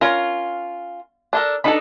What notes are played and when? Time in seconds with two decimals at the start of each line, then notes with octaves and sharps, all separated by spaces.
0.01 C#4 F4 A#4
1.33 D4 A4 A#4
1.64 D4 D#4 A4 B4 B5